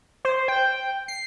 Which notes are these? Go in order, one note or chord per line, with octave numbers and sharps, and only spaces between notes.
C5
G5
C7